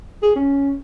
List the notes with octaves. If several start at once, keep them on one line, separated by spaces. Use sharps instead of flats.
G#4
C#4